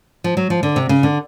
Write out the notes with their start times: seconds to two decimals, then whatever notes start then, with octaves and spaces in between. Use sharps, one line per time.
0.24 F3
0.37 F#3
0.50 F3
0.63 D3
0.76 C3
0.89 C#3
1.03 D3